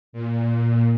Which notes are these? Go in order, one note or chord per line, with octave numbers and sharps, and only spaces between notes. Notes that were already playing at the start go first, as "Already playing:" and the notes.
A#2